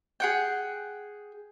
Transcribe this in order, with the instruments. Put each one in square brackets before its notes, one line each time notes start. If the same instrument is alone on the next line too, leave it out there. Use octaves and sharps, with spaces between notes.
[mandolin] G#4 F#5 G5